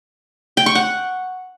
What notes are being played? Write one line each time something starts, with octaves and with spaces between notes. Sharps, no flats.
G5
C#6
F#5